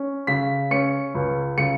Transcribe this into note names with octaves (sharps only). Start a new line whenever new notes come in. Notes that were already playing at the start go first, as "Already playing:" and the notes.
Already playing: C#4
C#3 B6
C#4 C#7
C#2
C#3 C#7